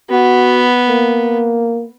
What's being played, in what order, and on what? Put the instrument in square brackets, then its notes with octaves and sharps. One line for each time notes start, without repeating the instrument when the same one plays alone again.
[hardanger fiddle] B3 [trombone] F#4
[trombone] A#3